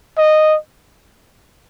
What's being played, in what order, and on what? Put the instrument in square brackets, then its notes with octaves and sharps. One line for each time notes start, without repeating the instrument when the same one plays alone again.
[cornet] D#5